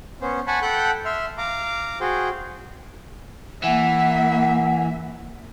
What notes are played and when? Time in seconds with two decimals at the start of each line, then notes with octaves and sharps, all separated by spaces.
0.21 B3 C#4 C5
0.47 F#5 G#5 A5 B5 C#6
0.62 A4 F#5 G5 B5 F#6 G6
1.05 E5 C6 F6
1.38 F5 A#5 D6
2.00 F#4 G#4 C5 G5
3.63 E3 A#3 E5 F#5